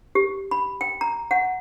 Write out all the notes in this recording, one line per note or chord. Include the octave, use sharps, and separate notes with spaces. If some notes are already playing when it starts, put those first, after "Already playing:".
G4
B5
G5
A#5
F#5